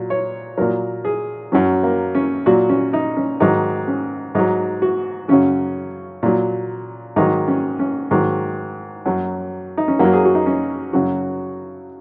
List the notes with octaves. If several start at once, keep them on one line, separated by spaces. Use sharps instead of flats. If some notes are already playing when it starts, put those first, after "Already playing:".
Already playing: A#2 F#3
C#5
A#2 F#3 A#4
G#4
F#2 F#3 C#4
A#3
C#4
A#2 F#3 F#4
C#4
D#4
C#4
G#2 D#3 F#3 D#4
C#4
G#2 F#3 D#4
F#4
F#2 C#3 F#3 C#4
A#2 F#3
G#2 D#3 F#3 D#4
C#4
C#4
G#2 D#3 F#3
F#2 F#3
D#4
C#4
F#2 F#3 A#3
G#4
F#4
D#4
C#4
F#2 C#3 F#3 F#4